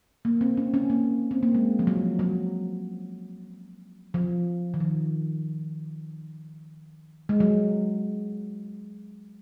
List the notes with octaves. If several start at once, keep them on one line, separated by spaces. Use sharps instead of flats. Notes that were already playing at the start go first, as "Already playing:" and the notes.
A#3
C4
C#4
C#4
A#3
C4
A#3
G#3
F3
F#3
F#3
F3
D#3
F3
G#3
F#3